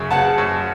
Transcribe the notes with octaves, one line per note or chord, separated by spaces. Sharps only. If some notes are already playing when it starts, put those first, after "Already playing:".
Already playing: F#2 C#3
C#3 F#5 A5
F#2